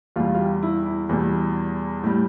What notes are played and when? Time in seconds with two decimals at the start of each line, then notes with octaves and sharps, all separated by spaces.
0.16 E2 B2 G3 F4
0.35 F4
0.39 G4
0.63 E4
0.86 E4
1.09 E2 B2 G3
2.04 A2 G3